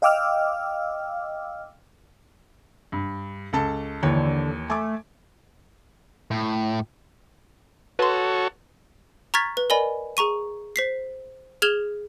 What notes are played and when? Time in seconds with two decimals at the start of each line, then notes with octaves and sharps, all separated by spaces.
0.02 D#5 F5 G5 D6 E6 F6
2.92 G2
3.53 C#2 A4 A5
4.03 D#2 D3 E3 C#5
4.70 A3 G#5 D6
6.31 A2
7.99 F#4 A4 B4 C#5 C6
9.34 A#5 C#6 F6 G#6 A6 B6
9.57 B4
9.70 A#4 D5 D#5 G#5 B5
10.17 G#4 A#5 C#6 D#7
10.76 C5 B6 C7
11.62 G#4 F6 G#6 E7 F7 G7